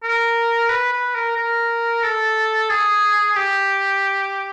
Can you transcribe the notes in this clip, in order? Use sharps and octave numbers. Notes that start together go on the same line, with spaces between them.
A#4
B4
B4
A#4
A#4
A4
G#4
G4